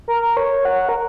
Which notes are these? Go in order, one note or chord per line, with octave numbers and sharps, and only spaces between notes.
A#4
C#5
F#5
A#4